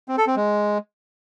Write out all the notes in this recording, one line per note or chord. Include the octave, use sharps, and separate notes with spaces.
C4
A4
C4
G#3